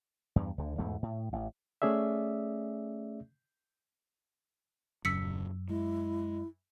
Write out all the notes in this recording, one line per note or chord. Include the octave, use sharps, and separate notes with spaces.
E2 G2
D2 D3
E2 G#2 B2 A3
A2
A1
A3 C#4 G#4 D5 E5
D#1 F#2 C#3 E6 B6 C#7
G#3 E4